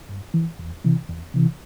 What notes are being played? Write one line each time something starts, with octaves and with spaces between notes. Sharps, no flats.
G2
E3
E2
C3 E3
E2
C3 E3